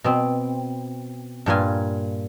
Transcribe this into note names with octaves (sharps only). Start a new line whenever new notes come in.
B2 C4
G2 A#2 F4 G#5